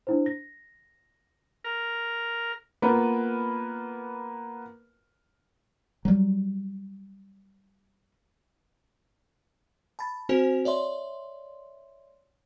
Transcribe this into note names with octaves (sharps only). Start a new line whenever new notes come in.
D4 E4 C5
A#6
A#4
A#3 B3 F4 A#4 B4
F#3 G3
A5 B5 A6
C4 F#4 C5 G#5 F7
C#5 D5 E5 C6